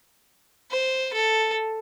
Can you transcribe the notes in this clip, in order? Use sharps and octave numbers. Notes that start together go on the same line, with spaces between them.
C5
A4